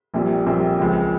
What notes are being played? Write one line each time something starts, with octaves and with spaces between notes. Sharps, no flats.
A#1 A#2 G3 C4
A#1 A#2 G3 C4
C#2 C#3 F3 G#3 C4